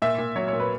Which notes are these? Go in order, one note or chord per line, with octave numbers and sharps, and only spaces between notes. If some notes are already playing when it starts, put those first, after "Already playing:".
A#2 E5
A#2
F#3 C#5
C#5
A#2
B4